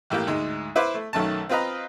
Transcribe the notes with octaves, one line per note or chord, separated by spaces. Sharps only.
A1 A2 A#3 G4
D2 G#2 G#3
E4 B4 C5 D6
A3
B1 D#3 A3 C#4 A5
C4 F4 B4 D#5 A#5